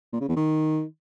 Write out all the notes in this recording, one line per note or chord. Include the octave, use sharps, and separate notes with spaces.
A#2
C#3
E2
D#3